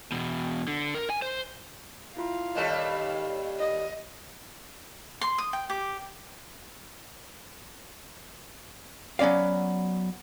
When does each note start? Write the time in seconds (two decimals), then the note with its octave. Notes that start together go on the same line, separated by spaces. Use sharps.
0.12 E2 B2
0.68 D3
0.95 A#4
1.10 G#5
1.22 C5
2.17 E4 F4 F5 C6
2.55 D#2 G3 A4 D#5 C#6
3.59 D#5
5.21 C6
5.38 D#6
5.53 G5
5.70 G4
9.19 F#3 B3 C#4 D5 F5